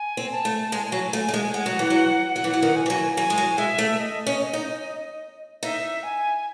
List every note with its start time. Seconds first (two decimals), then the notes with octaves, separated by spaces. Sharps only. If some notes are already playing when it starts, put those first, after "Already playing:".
Already playing: G#5
0.17 C4
0.32 A5
0.45 A3
0.72 G#3 G#5
0.92 F#3
1.13 A3
1.29 A3
1.34 G#3
1.54 G#3 F#5
1.66 F#3
1.79 E3
1.90 F#3
2.36 F#3 F#5
2.44 E3
2.53 F#3
2.62 D#3
2.76 G#5
2.86 E3
2.90 F#3
3.17 F#3 G#5
3.30 G#3
3.38 F#3
3.58 G#3 E5
3.78 A3
4.00 D#5
4.27 C#4
4.53 D#4
5.63 D#4 E5
6.03 G#5